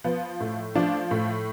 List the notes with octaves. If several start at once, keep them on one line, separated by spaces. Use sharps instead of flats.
F3 B3
A2
F3 D4
A2